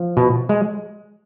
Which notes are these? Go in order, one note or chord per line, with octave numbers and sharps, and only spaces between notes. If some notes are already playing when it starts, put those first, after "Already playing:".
Already playing: F3
B2
G#3